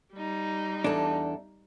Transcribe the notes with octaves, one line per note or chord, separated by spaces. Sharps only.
G3 D#4
E2 D4 A4